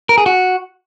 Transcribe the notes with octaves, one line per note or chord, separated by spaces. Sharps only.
A#4
G#4
F#4